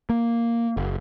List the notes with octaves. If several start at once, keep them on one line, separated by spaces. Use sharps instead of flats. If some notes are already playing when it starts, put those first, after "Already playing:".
A#3
F#1